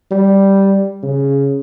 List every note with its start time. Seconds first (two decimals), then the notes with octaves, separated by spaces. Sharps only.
0.11 G3
1.03 C#3